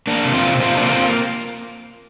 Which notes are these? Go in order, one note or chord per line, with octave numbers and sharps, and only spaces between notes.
A#3 D4
C3
C4 F4
C3
C3 C4 F4
A#3 D4
C4 F4